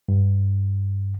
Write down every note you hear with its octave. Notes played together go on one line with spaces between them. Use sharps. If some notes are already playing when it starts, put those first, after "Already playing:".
G2